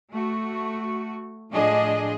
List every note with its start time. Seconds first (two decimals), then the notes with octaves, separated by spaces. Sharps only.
0.13 A3 F#4
1.51 A2 F3 D4 G#4 D#5